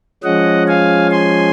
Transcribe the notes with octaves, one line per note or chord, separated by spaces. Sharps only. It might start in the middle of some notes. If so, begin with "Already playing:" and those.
F3 G#3 C#4 D#5 F#5
F5 G#5
G#5 C6